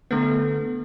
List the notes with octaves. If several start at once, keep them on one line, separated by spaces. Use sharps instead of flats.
D3 A3 B3